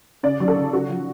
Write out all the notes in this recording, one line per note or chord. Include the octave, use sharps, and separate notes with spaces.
C#3 D5
F#3
A4
C#3
C#3 F#4
F3